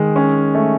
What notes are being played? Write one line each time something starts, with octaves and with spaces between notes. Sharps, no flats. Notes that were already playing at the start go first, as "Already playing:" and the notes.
Already playing: D#3 G#3
C#4
A3